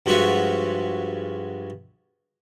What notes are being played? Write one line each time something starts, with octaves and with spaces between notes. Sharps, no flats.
G2 F3 G#3 F4 F#4 E5